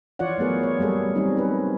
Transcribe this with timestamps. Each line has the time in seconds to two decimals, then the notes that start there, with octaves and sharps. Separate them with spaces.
0.19 E3 F4 C#5 D5 F#5
0.38 F#3 A3 B3 G#4 A#4
0.63 C#5
0.79 F#3 G3 A#3 G#4 A4
1.16 G3 C4 C#4 D#4
1.37 C#4 B4